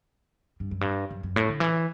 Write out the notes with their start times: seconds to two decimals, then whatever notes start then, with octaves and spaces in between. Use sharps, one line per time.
0.60 G2
0.71 F#2
0.81 G2
1.10 F#2
1.23 F#2
1.36 A2
1.48 D3
1.60 E3